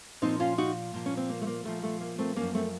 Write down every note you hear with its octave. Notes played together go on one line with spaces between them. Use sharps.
A#2 F3 C4 D#4
C#4 F4
D#4 F#4
A#2 F3
C#4
C4
A#3
A3
A#3
A#2 F3 A3
A3
A#3
A3 C4
F#2 F3 A#3 C#4
A3 C4